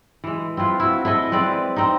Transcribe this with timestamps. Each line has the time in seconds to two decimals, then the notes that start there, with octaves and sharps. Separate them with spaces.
0.24 E3 G#3
0.57 C4 E4 F4 B4
0.80 E4 F#4
1.05 E4 G#4 A4 D#5
1.32 G#3 C4 B4 D5
1.76 C4 D#4